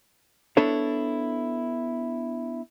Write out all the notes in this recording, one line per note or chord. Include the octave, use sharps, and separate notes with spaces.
B3 D4 E4 A4 C#5